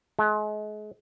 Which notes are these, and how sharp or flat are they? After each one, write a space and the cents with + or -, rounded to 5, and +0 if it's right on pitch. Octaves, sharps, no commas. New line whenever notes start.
G#3 +35